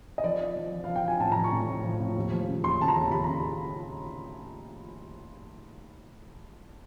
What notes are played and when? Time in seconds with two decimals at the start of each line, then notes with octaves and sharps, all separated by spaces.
0.18 D#5
0.24 F3 D5
0.40 F3
0.56 F3
0.72 F3
0.84 F5
0.88 F3
0.96 G5
1.04 F3 G#5
1.20 A2 A5
1.32 A#5
1.36 F3
1.44 C#6
1.52 A2
1.68 A2
1.84 F3
2.00 A2
2.16 D#2
2.32 F3
2.48 C#3
2.64 D#2 C6
2.80 C#3 A5
2.88 A#5
2.96 D#2
3.11 D#2 B5
3.24 A#5
3.28 C#3